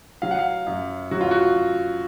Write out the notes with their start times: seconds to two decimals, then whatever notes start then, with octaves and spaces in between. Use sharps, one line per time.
0.22 F#3 F5
0.31 F#5
0.39 F5
0.67 F#2
1.11 F#3 F#4
1.21 F4
1.31 F#4